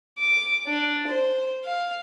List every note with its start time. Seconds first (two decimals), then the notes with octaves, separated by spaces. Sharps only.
0.19 D6
0.67 D4
1.07 C5
1.64 F5